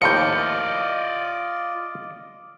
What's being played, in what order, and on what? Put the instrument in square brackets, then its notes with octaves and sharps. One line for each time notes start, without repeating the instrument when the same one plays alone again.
[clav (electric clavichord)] D#2 A2 F3 [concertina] F4 [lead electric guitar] D5 D#5 [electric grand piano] G6 C#7